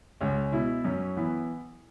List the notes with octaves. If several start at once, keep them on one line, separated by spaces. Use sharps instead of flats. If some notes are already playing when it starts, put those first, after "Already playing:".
C#2 C#4
B2 E4
F#2 C#4
E3 B3